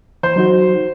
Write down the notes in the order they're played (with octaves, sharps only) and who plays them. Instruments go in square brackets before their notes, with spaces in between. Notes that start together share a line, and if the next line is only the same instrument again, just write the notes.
[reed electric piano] E3 [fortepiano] C5
[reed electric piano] F#3 D#4 F#4